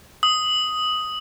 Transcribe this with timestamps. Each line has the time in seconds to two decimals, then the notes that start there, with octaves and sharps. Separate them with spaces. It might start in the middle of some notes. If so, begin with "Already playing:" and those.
0.23 D#6